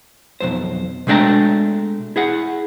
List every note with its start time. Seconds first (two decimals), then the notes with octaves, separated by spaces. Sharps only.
0.41 B1 F2 C5
1.07 B2 G#3 A3 D4 G5 A#5
2.16 E4 G#4 F#5